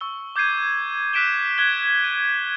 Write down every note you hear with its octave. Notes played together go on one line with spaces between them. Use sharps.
C#6 E6 G7
D6 G6 G#6 C7 D#7
E6 F#6 B6 D7 E7 G7
F#6 G#6 G7
D#7